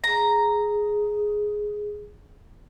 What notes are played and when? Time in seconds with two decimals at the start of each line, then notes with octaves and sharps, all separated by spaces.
0.04 G#4 A#5